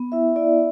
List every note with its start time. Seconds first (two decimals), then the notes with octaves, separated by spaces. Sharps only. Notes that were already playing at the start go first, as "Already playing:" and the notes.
Already playing: B3
0.12 E4 E5
0.36 E4 D5